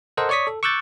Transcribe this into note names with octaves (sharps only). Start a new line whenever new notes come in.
A4 A#4 C5 D#5 F#5
C#5 D5 C#6 D#6 B6
A4
C#6 D6 E6 F#6 G6 A6